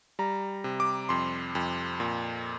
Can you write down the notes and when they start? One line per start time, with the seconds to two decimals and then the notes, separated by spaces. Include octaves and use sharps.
0.19 G3 A#5
0.64 C3
0.80 D6
1.09 F2 C6
1.55 F2
2.00 A#2